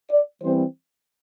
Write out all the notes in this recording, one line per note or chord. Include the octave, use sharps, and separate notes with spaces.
D5
E3 G3 C4 C5